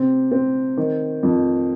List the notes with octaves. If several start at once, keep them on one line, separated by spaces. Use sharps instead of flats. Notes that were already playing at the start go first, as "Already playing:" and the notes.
Already playing: C3 C4
C4
D#3
F2